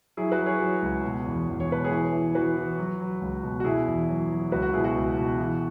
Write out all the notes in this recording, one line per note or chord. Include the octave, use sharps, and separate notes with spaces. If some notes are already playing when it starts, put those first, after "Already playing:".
F#3 E4 G#4
F#4 B4
F#3
G#4 C#5
F#3
C#2
B2
E2
E2
C#5
B2 B4
G#4 C#5
E3
E3
E3 F#4 B4
E3
F#3
F#3
C#2
B2
F#4
B2 E4 G#4
E2
F#3
F#3
C#2 F#4 B4
F#4
B2 E4 G#4
F#4
C#2
B2
E3